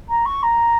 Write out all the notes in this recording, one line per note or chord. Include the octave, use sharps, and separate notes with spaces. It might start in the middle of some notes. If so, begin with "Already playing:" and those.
A#5
C#6
A#5